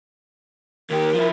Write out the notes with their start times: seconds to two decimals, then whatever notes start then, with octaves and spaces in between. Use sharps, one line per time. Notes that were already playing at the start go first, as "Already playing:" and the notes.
0.90 D#2 G4 A#4
1.14 F3 E4